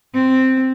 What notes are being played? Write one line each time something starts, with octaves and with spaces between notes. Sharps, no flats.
C4